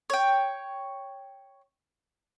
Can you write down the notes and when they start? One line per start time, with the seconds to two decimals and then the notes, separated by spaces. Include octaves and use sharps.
0.10 C#5 G5